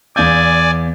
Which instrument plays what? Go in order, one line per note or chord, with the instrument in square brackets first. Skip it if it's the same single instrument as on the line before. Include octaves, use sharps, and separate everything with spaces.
[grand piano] E2 F5 G6 [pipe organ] D5 G#5